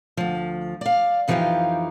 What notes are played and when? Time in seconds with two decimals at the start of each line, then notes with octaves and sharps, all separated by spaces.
0.17 D2 F3
0.81 D5 F5
1.28 F2 E3 F3 D#4 G4 F5